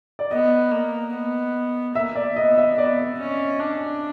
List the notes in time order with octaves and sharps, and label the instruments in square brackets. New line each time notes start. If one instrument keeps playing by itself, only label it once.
[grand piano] D5
[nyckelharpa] B3 [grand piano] D#5
[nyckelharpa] A#3
B3
[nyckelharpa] A#3 [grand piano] E5
[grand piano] D5
[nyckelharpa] B3 [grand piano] D#5
[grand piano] E5
[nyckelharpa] B3 [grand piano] D5
[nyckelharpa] C#4
D4